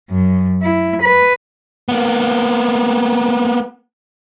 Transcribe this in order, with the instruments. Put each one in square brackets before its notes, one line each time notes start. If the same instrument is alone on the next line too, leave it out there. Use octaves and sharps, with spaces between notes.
[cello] F#2
E4
B4
[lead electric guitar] A#3 B3